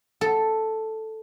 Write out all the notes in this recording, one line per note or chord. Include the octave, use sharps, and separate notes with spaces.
A4